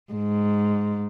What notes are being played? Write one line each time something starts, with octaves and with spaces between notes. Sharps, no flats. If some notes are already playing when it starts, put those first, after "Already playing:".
G#2